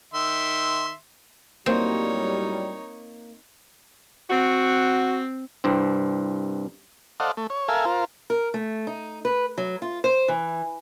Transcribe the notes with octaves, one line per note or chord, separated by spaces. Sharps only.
D#3 E5 C6
A2 F#3 G3 A#3 C4 D#4 C#5
C4 F#4
C2 G2 C4
A4 C5 D5 D#5 F5 F#5
A3
C#5
A4 A#4 E5 F5 G#5
F4 A#4 C5
A#4
A3
D#4
B4
F#3
F4
C5
E3